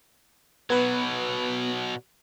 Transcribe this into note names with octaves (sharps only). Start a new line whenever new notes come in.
B2 F#3 B3 B4